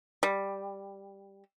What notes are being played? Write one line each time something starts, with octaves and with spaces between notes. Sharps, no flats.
G3